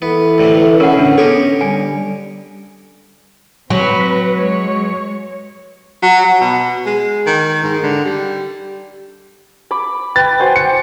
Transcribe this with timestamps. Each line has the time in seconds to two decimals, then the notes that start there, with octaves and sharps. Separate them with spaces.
0.02 E3 B3 A4
0.38 D2 A2 C3
0.80 B2 C#4 A#4 F#5
0.98 A2 D3 D4
1.18 B3 C#4 D#4 G4 A4 C#5
1.61 D3 G3 G#5
3.70 F#3 C4 B4
4.38 G#3 C#5
6.03 F#3
6.25 F#3
6.41 B2
6.86 G#3
7.26 D#3
7.63 G#2
7.83 D3
8.05 G3
9.71 B5 D6
10.16 B4 G5 A6
10.40 F#4 C5 G#5
10.56 C#7